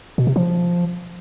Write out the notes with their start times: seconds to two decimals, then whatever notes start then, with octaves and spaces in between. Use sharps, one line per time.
0.18 B2
0.27 C3
0.36 F3